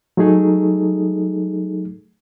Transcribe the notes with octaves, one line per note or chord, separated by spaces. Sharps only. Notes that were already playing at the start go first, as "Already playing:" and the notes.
F#3 A3 D#4 G#4 A4